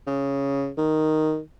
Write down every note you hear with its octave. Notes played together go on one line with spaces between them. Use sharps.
C#3
D#3